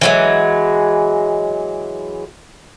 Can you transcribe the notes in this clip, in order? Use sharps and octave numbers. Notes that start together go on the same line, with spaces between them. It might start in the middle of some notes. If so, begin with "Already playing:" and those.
E3 F#3 G#3